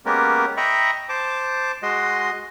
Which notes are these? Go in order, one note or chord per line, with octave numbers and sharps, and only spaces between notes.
G#3 A#3 B3 C#4 G4 A#4
D#5 E5 G5 A#5 B5 C#6
C5 A5 D6
G#3 F#4 D#5 C6